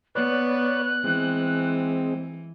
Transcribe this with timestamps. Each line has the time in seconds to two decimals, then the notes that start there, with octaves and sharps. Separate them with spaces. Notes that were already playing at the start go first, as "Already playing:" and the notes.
0.15 B3 B4 C#5 D5 F#6
1.04 E3 G#3 C4